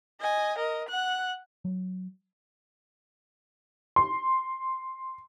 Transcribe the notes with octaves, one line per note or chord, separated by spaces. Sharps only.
D#5 G#5
A#4 D#5
F#5 F#6
F#3
C6